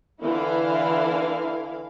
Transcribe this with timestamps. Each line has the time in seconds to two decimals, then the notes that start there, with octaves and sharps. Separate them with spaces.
0.22 D3 E3 E4 F5